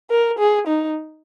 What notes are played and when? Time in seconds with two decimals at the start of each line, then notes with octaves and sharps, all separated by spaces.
0.11 A#4
0.39 G#4
0.67 D#4